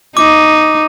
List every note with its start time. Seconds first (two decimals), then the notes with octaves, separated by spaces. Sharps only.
0.17 D#4 D6